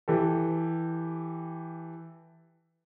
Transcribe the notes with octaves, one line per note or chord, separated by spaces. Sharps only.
E3 G4 A4